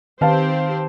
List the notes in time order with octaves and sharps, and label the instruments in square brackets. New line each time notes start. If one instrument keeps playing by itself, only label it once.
[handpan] D#3 [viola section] C4 G4 C5 [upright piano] B4 F5 A5